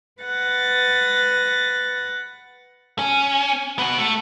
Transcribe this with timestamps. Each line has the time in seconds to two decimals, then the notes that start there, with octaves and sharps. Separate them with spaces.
0.21 B4 F#5 A6 A#6
2.99 C#4
3.79 B3 F#4
3.98 A3